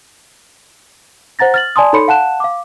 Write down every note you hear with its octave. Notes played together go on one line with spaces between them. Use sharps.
C5 F#5 A#5 A6 A#6
F6 A6 F#7
D5 G#5 A5 C6 D#6
D#4 A4 C#5 B5 C6 C#7
F5 F#5 A5 F#6 E7
F5 D6